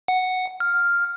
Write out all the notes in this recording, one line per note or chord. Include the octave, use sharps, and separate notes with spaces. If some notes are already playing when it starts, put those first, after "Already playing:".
F#5
F6